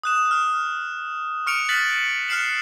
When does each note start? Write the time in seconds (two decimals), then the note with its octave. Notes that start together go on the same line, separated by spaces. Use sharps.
0.03 D#6 F#6 E7
0.31 D#6 F6
1.46 C#6 F6 C#7 D7 F7
1.69 F#6 A6 B6 F#7
2.28 F6 F#6 C7 C#7 E7 F#7